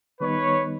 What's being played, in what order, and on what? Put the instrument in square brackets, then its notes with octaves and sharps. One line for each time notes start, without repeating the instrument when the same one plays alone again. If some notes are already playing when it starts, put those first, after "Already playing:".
[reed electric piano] D#3 G3 B3 D#4 [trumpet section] B4 C#5